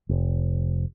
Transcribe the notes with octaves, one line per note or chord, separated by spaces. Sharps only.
F1